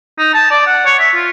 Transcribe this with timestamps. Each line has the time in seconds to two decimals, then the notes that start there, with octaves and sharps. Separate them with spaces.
0.18 D#4
0.34 A5
0.51 D5
0.67 F#5
0.86 C#5
0.99 E5
1.15 F4